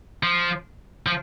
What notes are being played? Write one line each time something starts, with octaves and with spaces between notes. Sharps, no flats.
F3
F3